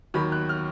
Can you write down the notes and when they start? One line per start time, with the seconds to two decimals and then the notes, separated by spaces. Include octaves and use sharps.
0.14 D#2 D#3 F#3 B5
0.32 F#6
0.49 F6